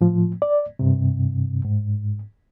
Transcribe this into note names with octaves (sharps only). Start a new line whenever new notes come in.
A2 F3
D5
G2 C3
G#2